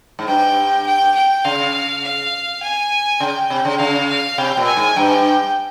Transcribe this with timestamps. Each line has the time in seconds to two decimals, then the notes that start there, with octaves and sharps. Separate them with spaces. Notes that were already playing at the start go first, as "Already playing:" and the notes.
0.19 G#2
0.28 G2 G5
0.86 G5
1.15 G5
1.45 C#3 F5
2.04 F5
2.63 G#5
3.20 C#3 G5
3.50 C3
3.65 C#3
3.79 C#3 F5
4.09 F5
4.38 C3 G5
4.57 A#2
4.67 G#5
4.76 G#2
4.96 G2 G5